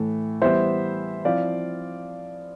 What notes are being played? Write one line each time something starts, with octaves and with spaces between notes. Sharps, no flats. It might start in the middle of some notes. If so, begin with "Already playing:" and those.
Already playing: A2 E3 A3
E3 G3 B3 C5 E5
F3 C4 E4 D5 F5